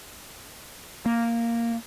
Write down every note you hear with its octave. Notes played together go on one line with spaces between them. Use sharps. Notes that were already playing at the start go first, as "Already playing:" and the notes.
A#3